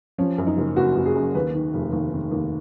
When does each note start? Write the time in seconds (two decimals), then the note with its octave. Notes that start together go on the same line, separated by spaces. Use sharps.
0.18 F3 C#4
0.38 F#2
0.47 D#4
0.58 F#1
0.76 F#1 F#4
0.96 F#1
1.06 G#4
1.16 F#2
1.35 D#2 B4
1.55 D#3
1.74 F1
1.93 D#2
2.13 D#3
2.31 D#2